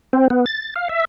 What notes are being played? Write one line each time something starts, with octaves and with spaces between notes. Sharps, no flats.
C4
B3
A6
F5
E5